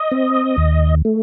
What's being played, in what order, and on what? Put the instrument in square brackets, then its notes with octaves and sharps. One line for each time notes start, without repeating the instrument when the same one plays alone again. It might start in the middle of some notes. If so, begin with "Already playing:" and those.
Already playing: [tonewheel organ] D#5
C4
D#2
A3